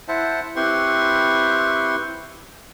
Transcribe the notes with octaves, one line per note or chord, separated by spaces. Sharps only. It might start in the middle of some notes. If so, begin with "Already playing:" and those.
E4 C5 E5 F#5 A5
C4 E4 G4 B4 C6 C#6